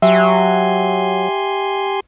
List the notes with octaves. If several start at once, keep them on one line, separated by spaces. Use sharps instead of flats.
F#3 G4 E5 G#5 C6